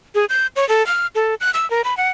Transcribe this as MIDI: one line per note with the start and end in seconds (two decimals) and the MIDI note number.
0.15 0.25 68
0.29 0.47 91
0.56 0.67 73
0.69 0.85 69
0.87 1.07 89
1.15 1.35 69
1.41 1.51 90
1.54 1.69 88
1.71 1.82 70
1.84 1.97 83
1.97 2.09 78